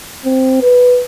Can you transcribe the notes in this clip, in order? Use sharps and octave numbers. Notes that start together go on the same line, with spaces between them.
C4
B4